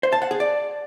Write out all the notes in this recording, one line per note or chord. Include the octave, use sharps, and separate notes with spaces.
C5
A5
F#5
G#4
D5